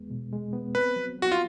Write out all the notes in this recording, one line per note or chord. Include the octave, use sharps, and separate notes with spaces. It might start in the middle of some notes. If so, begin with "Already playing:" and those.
Already playing: E2 G#3 B3
B2
G#3
B3
C4 B4
F#3
F#3 F#4
F4